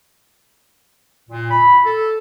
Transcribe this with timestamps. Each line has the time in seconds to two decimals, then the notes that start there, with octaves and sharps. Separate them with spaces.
1.30 A#2
1.50 B5
1.85 A4